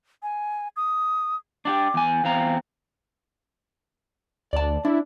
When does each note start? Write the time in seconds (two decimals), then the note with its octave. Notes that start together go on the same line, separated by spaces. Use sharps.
0.23 G#5
0.76 D#6
1.65 D4 F#4 G4 D6
1.94 E2 G#5
2.24 E2 C4 F5 A#5
4.53 D2 D5 A5
4.85 D4 E4